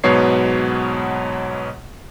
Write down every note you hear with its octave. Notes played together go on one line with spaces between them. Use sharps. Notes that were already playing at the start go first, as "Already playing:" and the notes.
G#2 B2 F#3 B3 C#5 C7